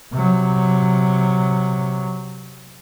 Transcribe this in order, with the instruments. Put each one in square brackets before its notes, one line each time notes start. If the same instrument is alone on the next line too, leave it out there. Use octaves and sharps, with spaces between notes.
[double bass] C3 F#3